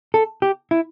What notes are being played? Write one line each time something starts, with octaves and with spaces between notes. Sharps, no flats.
A4
G4
E4